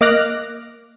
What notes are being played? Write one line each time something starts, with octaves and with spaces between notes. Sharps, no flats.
A#3 D#5 D6 F6 F#6 A#6